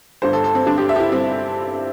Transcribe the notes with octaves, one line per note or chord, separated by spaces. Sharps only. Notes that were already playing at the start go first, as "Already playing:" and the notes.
G1 G2 G3 C5
A4
A4
C4
G1 G2 G3 D4
G4
E5
G4
E4
G3 C4